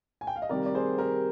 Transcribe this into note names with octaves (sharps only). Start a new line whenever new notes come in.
G#5
G5
F5
D#5
C3 D#3 G3 C4 A#4 D5
D5
G#4 C5
G4 A#4